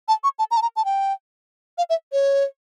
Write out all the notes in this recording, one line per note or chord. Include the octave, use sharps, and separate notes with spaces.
A5
C#6
A5
A#5
A5
A#5
A5
G5
F5
E5
C#5